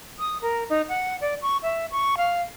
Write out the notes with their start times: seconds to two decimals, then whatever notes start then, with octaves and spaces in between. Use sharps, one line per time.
0.19 D#6
0.42 A#4
0.70 D#4
0.89 F#5
1.21 D5
1.42 C#6
1.63 E5
1.91 C#6
2.17 F5